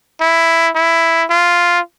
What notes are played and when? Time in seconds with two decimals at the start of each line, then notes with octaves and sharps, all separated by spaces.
0.21 E4
0.75 E4
1.31 F4